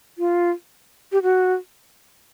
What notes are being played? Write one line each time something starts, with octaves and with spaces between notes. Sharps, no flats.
F4
G4
F#4